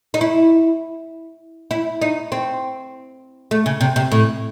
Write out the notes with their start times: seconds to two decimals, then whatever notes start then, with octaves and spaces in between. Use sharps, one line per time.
0.14 D#4
0.21 E4
1.71 E4
2.01 D#4
2.32 C4
3.51 A3
3.66 C#3
3.81 C3
3.96 C3
4.12 A2